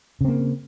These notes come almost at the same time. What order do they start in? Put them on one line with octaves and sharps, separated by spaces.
C#3 C4 A#3